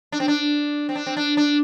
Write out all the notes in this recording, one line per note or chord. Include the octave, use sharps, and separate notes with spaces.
D4
C4
D4
C4
D4
C4
D4
D4